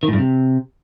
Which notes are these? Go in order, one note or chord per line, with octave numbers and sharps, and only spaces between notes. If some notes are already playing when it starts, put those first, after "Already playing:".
D#3
A2
G2
C3